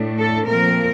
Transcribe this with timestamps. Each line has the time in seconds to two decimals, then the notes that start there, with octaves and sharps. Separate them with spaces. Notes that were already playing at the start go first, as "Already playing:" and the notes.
Already playing: A2 A3 D4
0.18 A4
0.47 A#2 F3 A3 C4 A#4